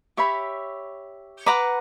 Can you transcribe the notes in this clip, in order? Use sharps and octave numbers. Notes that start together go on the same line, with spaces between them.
G4 C#5 E5 B5
B4 F#5 A#5 D6